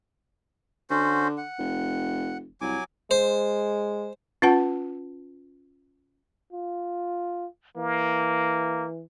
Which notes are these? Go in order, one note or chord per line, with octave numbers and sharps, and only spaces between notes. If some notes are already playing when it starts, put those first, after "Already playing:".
D3 C#4 F#4 C5
F#5
F1
C2 F#3 G#5 D6
G#3 C5
C#4 F4 B4 F#5 A5
F4
E3 A#3